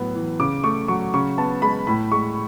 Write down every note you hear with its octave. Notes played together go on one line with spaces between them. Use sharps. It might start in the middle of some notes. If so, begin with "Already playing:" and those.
Already playing: A2 F#3 B3
E3
C#3 D6
A3 C#6
F#3 C#6
C#3 C#6
B3 A5
G#3 B5
A2 B5
G#3 C#6